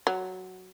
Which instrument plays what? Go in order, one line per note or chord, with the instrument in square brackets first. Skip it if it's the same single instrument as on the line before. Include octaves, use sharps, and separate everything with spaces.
[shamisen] F#3